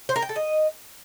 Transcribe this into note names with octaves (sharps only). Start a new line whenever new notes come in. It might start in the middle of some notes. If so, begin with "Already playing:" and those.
C5
A#4
G5
A4
D#5